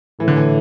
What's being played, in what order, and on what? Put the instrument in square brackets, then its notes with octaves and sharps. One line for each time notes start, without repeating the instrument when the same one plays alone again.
[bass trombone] A2 [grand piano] E3
[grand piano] D3
E3